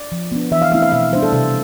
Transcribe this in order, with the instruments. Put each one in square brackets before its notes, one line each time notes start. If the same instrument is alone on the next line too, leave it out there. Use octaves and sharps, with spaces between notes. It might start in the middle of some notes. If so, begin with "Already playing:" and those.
Already playing: [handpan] D5
F3
B3 D4
E3 E5
F5
A3 C4 E4 F5
F5
B2 E5
G3 B3 D4 C5
A4
C3 A4